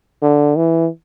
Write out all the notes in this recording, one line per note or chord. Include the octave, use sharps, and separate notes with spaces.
D3
E3